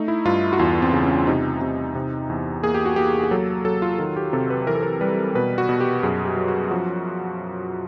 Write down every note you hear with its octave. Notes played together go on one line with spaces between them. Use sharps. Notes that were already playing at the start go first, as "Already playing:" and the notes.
Already playing: A3 D#4
E4
G2 F4
F#4
E2 F4
C4
C#3
C#4
C3 D#4
C3
C3
E2
A#3 G#4
G4
F#4
A#3 G4
G#4
F#3 A4
F#3 A4
F4
D#3 F4
G4
C3 A4
B4
E3 A#4
A4
A#4
G3 B4
B2 B4
F#4
B2
G4
F#2 G#4
G4
F#3
F#4
F3 F#4